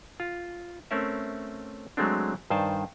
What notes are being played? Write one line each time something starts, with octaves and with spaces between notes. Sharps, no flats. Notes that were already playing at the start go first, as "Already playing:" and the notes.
F4
A3 C4 C#4 A#4 E5
F#3 G#3 A3 C4 D4
G2 D#3 C5 D5 G#5 A5